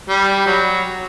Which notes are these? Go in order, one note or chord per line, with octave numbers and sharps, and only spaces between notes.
G3
F#3